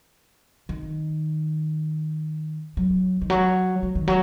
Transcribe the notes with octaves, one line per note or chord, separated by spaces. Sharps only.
D#3
F#3
D#3
F#3
F#3
D#3
F#3